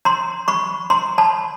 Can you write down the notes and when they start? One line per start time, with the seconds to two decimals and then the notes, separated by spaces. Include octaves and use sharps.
0.05 A#5 C6
0.48 B5 C#6
0.90 A#5 C6
1.18 A5 B5